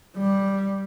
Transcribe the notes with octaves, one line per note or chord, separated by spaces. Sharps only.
G3